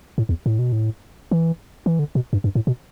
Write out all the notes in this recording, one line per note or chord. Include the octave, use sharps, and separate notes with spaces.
A2
E2
A2
B2
A2
E3
E3
D3
B2
G2
G2
A2
B2